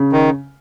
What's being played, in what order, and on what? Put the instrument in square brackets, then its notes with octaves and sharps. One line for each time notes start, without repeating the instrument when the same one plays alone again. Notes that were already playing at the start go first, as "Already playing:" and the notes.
Already playing: [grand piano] C#3
[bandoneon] D#3